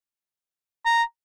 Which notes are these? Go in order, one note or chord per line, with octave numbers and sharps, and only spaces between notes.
A#5